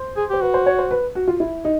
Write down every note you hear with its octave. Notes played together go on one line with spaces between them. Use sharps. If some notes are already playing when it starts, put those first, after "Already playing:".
Already playing: C5
G#4
G4 C5
F#4 B4
C5
C#5
C5
B4
F#4
F4
E4
D#4